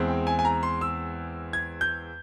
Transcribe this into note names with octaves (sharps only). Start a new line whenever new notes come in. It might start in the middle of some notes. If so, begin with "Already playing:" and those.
Already playing: E2 E3 G#3 C4
G5
G#5
G#5
A#5
C6
E6
G#6
G6